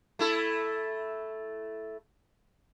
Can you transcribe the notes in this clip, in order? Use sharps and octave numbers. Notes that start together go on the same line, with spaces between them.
A3 E4 A4